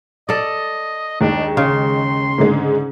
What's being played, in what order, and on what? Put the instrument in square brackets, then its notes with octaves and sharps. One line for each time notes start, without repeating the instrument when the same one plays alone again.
[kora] A4 D5 [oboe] D#5
[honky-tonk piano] D#2 G#3 D#4 [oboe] D4
[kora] C#3 [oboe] C6
[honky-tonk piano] G#2 D3 G#3